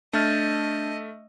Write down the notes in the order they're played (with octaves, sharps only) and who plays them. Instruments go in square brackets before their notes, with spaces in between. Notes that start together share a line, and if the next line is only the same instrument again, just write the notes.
[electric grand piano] A3 E5 F6 [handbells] D4 G6 A6 [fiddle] D#5